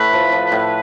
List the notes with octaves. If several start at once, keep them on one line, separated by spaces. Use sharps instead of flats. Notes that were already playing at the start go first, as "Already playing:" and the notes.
Already playing: A2 A3 B4
F3
F3
A2